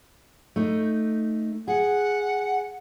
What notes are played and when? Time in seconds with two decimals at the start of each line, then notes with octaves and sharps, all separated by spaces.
0.56 A3 D#4
1.68 G#4 F#5